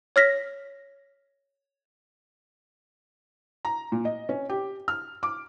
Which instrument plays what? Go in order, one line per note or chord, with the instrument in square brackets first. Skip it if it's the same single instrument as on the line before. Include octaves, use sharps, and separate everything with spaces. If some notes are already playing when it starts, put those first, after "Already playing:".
[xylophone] C#5 F6 A#6 B6
[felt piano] A#5
A#2
D#5
C#4
G4
F6
D6